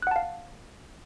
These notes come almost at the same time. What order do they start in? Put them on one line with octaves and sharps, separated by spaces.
F#6 F#5 A5 F5